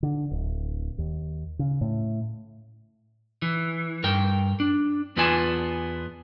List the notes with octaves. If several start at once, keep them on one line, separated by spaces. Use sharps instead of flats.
D3
D1
D#2
C#3
A2
E3
G2 A#4 G5
D4
E2 B3 F4 D5 G#5 A5